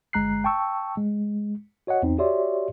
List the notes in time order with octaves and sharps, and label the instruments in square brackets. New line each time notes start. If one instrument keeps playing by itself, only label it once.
[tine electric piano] G1 G#3 A#5 F#6 C7
G5 A5 C#6 E6
G#3
F#4 C#5 D#5 F#5
E2 C4 D#4
F#4 G4 C#5 D5 E5 C6